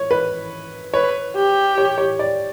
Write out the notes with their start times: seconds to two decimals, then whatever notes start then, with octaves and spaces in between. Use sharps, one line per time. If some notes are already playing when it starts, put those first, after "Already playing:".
Already playing: C#5
0.11 B4
0.94 B4 C#5
1.36 G4
1.78 C#5
1.98 C#5
2.19 D5